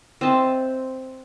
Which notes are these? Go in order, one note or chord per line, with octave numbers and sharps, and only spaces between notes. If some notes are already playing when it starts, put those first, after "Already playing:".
C4 D#5 E5 A5